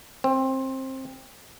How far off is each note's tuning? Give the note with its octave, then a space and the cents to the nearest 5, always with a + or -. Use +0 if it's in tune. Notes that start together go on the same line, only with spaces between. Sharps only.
C4 +20